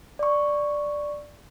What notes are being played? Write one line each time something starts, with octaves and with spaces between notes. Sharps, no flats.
D5 C#6